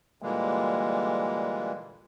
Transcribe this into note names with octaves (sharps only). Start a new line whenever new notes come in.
A#2 D3 E3 G3 G#3 A#3